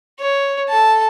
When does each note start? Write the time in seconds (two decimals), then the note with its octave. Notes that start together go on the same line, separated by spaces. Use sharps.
0.19 C#5
0.69 A4 A5